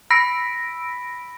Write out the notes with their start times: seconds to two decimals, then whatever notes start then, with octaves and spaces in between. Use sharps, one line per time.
0.10 B5 E6 A#6 B6 D7